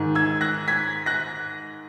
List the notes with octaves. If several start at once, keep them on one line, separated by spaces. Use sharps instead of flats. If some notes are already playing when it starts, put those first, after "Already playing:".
Already playing: G#2 D#3
E6 G#6
F#6 A#6
G#6 B6
F#6 A#6